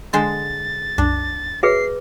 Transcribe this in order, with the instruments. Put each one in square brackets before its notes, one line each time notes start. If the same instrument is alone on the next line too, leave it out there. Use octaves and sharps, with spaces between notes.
[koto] D3 G#3 C5 [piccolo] A6
[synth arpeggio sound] C2 F#2 [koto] D4
[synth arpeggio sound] F#4 C#5 [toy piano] G#4 B4 E5 [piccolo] C7